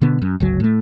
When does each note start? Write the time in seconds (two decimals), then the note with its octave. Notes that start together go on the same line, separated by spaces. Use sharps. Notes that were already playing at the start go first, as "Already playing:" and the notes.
0.01 B2 D3 B3
0.22 F#2
0.40 G1 C#2 F#3
0.60 A2 A3